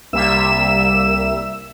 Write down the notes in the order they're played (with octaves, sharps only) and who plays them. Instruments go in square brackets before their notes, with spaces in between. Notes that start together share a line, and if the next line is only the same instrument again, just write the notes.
[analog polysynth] C2 G3 A#3 E5 E6 E7